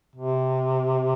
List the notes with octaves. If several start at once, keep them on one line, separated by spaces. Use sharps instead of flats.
C3